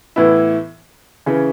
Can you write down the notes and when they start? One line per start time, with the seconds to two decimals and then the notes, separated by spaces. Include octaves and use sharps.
0.16 A2 E3 B3 E4
1.26 C#3 E3 C#4